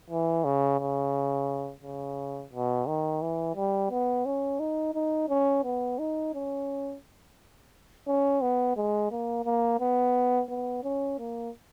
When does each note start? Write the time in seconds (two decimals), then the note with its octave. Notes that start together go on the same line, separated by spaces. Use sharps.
0.10 E3
0.44 C#3
0.79 C#3
1.83 C#3
2.53 B2
2.88 D#3
3.22 E3
3.56 G3
3.91 B3
4.26 C#4
4.60 D#4
4.95 D#4
5.29 C#4
5.64 B3
5.99 D#4
6.34 C#4
8.07 C#4
8.42 B3
8.77 G#3
9.11 A#3
9.45 A#3
9.80 B3
10.49 B3
10.84 C#4
11.19 A#3